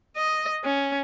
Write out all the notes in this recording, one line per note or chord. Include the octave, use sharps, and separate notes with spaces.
D#5
C#4